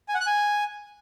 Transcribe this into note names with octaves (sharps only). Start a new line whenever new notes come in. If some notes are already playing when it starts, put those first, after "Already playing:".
G#5
F#5
F#6
G#5